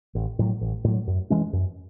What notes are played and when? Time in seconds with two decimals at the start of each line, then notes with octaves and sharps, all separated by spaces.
0.15 A1
0.39 A2 F#3
0.61 A1
0.84 A2 F#3
1.07 F#2
1.30 E3 G#3 C#4
1.53 F#2